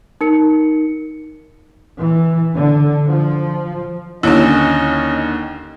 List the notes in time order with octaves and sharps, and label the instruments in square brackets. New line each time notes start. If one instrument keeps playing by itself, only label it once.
[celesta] D#4 A#4 C#7
[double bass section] E3
D3
F3
[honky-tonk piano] D#2 D3 [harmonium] C#4 D#5 [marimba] E4 C#5 A5